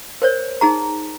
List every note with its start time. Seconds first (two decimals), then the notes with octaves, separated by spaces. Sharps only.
0.22 A#4 C5 C#5
0.61 D#4 G#4 A#5